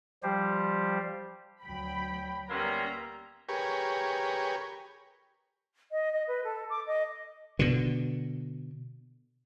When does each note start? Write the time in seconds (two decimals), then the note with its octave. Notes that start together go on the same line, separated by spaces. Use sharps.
0.23 F3 G3 G4 C5
1.64 D2 F#3 G5 B5
2.50 G3 A#3 B3 C#4 E5 A#5 C6
3.49 G4 G#4 A#4 B4 C#5
5.91 D#5
6.13 D#5
6.27 B4
6.44 A4
6.70 D6
6.87 D#5
7.59 B2 D3